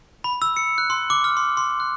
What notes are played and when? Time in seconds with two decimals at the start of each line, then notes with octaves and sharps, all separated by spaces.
0.24 B5
0.42 E6
0.57 C#7
0.78 F#6
0.90 C6
1.10 D6
1.24 F6
1.37 C6
1.57 C6
1.80 F#6